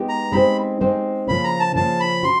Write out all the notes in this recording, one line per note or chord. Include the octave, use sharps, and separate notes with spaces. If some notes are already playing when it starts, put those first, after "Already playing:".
Already playing: G#3 B3 D#4 G4
A#5
G#3 C4 D#4 G4 C5 B5
G#3 C4 D#4 G4 C5
C#3 F3 A#3 C#4 B5
A#5
A5
C#3 F3 A#3 C#4 A5
B5
F#4 C6